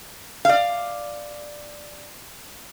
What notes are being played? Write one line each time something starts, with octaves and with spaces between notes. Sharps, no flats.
D5 F5